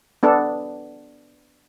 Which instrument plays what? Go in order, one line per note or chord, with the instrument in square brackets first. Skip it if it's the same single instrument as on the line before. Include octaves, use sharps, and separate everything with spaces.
[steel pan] B3 D4 A4